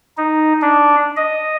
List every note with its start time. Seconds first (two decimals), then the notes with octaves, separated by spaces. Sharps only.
0.17 D#4
0.62 D4
1.16 D#5